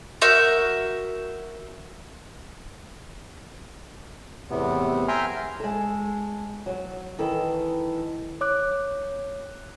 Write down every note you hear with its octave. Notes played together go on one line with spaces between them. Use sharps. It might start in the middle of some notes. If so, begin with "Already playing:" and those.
F#4 A#4 E5 G6
E2 A2 C3 B3
E5 G5 G#5 A#5 C6 F6
G#3 A4
F#3
D#3 E3 A4
C#5 D6 F#6